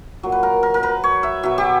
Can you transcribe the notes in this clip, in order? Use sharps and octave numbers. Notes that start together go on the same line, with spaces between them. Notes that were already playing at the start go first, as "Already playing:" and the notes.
A#2 F#3
B4
A#4
A#4
A#4
B4
C#5
E5
B2 F#3 E5
G4